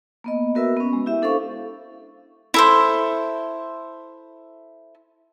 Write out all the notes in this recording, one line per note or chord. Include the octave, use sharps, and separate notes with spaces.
A#3 B3 D#5
B3 F#4 A#4 B4 E5 E6
B3 C#4
G#3
E4 G4 E5
D4 A4 C5 F5 C#6
E4 A4 C5